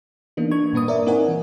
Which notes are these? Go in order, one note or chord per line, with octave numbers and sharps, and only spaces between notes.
E3 A#3 B3 D4 D#4
D4 C#6 G#6
G2 A#2 A#3 B4 D#6
A#4 D5 E5
C4 D#4 E4 A#4 F#5 G#5
E3